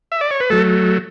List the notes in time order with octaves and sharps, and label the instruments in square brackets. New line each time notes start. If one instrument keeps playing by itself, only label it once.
[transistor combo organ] E5
D5
C#5
B4
F#3 A3 A4